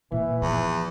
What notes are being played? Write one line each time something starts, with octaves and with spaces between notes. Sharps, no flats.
A#2 E3
E2 F3